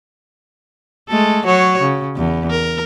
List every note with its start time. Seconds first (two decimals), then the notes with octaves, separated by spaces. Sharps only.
1.09 G#3 A3 A4
1.46 F#3 F#4 C#5
1.81 C#3
2.16 E2
2.51 A#4